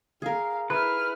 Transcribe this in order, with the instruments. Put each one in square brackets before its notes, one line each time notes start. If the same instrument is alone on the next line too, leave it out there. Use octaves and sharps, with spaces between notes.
[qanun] G#4 A#4 [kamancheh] F5
[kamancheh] E4 F6 [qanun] G#4 [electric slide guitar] B4